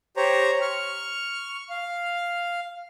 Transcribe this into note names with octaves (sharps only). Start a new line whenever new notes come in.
G4 C5 C#5 A#5
C#6 F6
F5